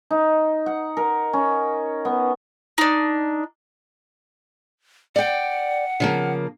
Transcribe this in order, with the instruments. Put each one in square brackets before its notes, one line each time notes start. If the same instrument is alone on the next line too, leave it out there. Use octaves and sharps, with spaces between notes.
[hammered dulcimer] D#4
F#5
A#4
C#4
B3
[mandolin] D4 D#4
[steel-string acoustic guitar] D5 G5 [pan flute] F#5
[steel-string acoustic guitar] C#3 F3 A#3